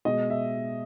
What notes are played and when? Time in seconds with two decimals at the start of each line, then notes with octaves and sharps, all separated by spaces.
0.05 B2 G#3 D#5
0.30 E5